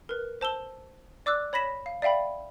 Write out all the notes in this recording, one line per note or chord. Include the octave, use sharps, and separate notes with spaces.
A#4 B4
C5 A5 E6 G7
D5 D6 E6 F#6
C#5 B5 A#6 B6 E7
F5
D5 E5 F5 G5 B5